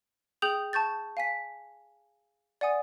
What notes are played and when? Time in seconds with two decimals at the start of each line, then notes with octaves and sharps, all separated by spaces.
0.42 G#4 G5 D#6 G6 F7 F#7
0.73 A5 C#6 G6 A6
1.17 F5 G#5 B6
2.61 D5 F#5 G#5 D#6